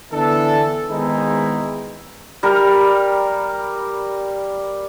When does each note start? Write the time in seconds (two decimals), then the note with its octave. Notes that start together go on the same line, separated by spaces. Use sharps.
0.12 D3 E3 B3 D4 A4
0.89 D#3 G#3 B3 C4 D#4 E4
2.43 G3 A#4